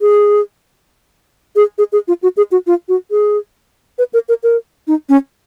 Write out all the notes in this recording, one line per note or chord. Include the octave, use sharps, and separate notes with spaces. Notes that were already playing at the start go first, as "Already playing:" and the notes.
G#4
G#4
G#4
G#4
F4
F#4
G#4
F#4
F4
F#4
G#4
B4
A#4
A#4
A#4
D#4
C#4